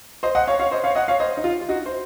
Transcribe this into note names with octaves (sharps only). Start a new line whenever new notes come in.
C5 D#5
D#5 F#5
C#5 F5
C#5 F5
C5 D#5
C#5 F5
D#5 F#5
C#5 F5
C5 D#5
D#4
F4
F4
D#4 F#4
C5